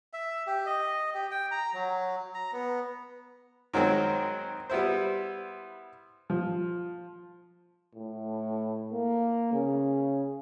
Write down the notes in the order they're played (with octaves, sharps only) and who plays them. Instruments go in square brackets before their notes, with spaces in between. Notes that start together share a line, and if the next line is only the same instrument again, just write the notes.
[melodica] E5
G4
D#5
G4
G5
A#5
F#3
A#5
B3
[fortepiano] D#3 F#3 G#3 C4
G3 B3 E4 C5
F3
[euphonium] A2
A#3
C#3